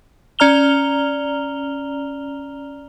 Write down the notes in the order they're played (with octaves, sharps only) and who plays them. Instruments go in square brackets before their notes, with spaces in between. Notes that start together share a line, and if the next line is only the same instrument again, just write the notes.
[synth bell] C#4 D5 A#5 F6 F7 G7